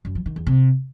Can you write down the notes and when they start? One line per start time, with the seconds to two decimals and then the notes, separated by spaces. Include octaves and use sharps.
0.05 F#2
0.15 F3
0.26 D#3
0.36 E2
0.47 C3